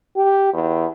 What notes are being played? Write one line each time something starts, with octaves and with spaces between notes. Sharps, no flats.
G4
E2